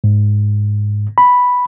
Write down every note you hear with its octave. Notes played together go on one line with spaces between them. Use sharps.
G#2
B5